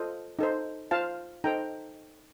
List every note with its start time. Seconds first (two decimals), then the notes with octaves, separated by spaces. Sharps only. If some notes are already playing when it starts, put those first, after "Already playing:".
Already playing: F4 A4 C5 D#5
0.39 D#4 A4 C5
0.91 F4 C5 F5 A5
1.44 D#4 A4 C5 G5 A#5